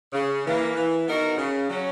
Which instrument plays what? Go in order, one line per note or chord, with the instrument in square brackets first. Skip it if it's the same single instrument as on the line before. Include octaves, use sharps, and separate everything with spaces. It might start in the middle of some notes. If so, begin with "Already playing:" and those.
[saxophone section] C#3
E3 A#3
E3
B3 D#4 F#4 A#4
C#3
F#3 C#4